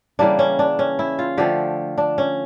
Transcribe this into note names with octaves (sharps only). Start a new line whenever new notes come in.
C#3 E3 G3 A#3 D4
C#4
D4
C#4
E4
F4
D3 F3 A3 G4
D4
C#4